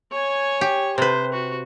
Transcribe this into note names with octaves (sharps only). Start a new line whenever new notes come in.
C#5 G#5
G4
C3 B4 C5
F#4